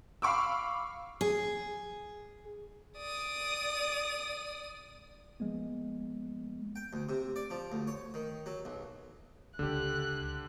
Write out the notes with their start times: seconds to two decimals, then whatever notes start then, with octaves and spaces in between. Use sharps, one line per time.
0.22 F5 B5 C#6 D6 E6
1.21 G#4
2.98 D5 D#6
5.40 F3 G#3 A#3 B3
6.76 G5
6.93 D2
7.09 C3
7.36 D5
7.50 F3
7.72 D2
7.87 C#5
8.14 D#3
8.46 F#3
8.65 B1
9.59 C#2 D3 G4 F#6